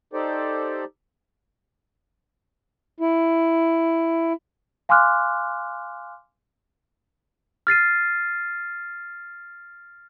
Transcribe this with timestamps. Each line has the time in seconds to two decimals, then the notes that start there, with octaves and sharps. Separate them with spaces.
0.13 D#4 G4 A4 C5 D5
3.00 E4
4.89 F5 G#5 C6 D6 F6 F#6
7.67 F6 A6 C7 D#7